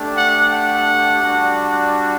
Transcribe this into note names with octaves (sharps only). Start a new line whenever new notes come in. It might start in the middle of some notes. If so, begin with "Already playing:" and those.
Already playing: A3 D4 G4
F#5
F#5
G3 D4 F#4